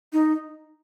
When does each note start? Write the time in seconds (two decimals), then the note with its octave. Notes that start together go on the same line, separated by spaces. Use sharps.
0.13 D#4